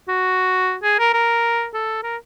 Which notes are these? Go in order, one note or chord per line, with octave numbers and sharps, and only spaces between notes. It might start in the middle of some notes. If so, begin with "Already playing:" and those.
F#4
G#4
A#4
A#4
A4
A#4